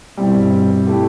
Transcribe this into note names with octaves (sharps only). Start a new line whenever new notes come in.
G2 B2 G3 C4 E4
A3 E4 G4